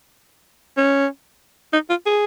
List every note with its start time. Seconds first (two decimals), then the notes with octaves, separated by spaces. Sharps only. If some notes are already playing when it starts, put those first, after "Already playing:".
0.77 C#4
1.73 D#4
1.90 F4
2.06 G#4